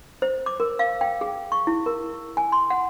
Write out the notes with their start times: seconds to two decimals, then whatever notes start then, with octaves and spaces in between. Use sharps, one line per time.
0.22 C5
0.46 D6
0.60 A#4
0.79 F5
1.01 G5
1.21 G#4
1.52 C#6
1.67 E4
1.86 A#4
2.37 G#5
2.52 C6
2.70 F#5